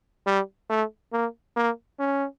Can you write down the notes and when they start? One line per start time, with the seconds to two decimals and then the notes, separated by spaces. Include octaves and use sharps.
0.26 G3
0.70 A3
1.13 A#3
1.57 A#3
1.99 C#4